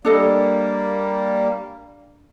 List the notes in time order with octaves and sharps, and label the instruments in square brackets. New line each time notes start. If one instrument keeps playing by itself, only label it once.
[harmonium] G3 A#3 [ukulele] D4 A4 D#5